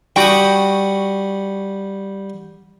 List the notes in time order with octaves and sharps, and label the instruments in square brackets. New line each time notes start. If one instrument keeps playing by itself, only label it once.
[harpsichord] G3 F#5 D#6 [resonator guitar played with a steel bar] F#4 G5